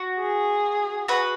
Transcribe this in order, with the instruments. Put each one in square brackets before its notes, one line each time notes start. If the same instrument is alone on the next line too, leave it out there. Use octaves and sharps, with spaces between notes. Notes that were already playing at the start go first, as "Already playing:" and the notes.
Already playing: [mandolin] F#4
[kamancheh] G#4
[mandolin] F#4 B4